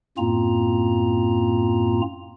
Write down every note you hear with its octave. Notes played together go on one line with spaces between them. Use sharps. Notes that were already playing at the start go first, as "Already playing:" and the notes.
F#2 A2 A#3 C4 F4 A#5